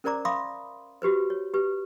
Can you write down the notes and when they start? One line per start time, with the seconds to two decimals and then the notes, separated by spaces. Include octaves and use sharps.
0.04 C#4 A#4 C5 D5 A#5 D6
0.25 E5 F5 B5 C6 D6 D#6
1.02 F#4 G4 B4 C5
1.30 C#5
1.54 G4 B4